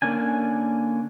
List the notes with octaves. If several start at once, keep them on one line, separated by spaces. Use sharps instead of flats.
D3 A#3 C#4 D4 G#5